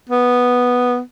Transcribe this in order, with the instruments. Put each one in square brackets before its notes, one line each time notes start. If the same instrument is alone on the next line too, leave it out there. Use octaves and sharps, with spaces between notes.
[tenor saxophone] B3